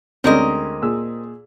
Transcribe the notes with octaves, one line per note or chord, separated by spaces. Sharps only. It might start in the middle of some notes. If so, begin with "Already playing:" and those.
D2 G#3 C4 C#4 A#4 D#5
A#2 G#4 E6